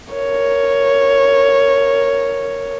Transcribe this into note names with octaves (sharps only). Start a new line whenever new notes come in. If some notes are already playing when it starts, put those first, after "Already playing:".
A#4 C#5